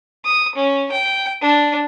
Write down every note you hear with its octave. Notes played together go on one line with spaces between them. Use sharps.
D#6
C#4
G5
D4